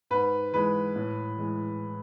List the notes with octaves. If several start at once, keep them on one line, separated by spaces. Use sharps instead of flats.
G#2 B4
E3 G#3 B4
A2
E3 G#3